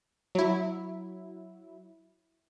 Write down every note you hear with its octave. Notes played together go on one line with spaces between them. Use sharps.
F#3 E4